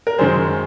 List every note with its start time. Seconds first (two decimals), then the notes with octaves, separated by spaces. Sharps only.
0.07 A#4
0.18 F#2 D#3 G#3 G#4 C5